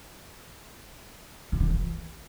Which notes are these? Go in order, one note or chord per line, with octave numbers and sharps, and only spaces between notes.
C#3
D3
E3